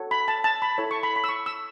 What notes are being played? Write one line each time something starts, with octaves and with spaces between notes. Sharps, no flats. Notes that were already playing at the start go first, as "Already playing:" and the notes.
Already playing: F#4 A4 C#5
B5
A5
A5
B5
E4 A4 C#5
C#6
B5
B5
E6
C#6
E6